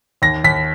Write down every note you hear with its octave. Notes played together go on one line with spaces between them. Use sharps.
D#2 A#6
D#2 B6